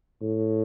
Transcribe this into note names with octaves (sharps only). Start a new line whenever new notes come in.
A2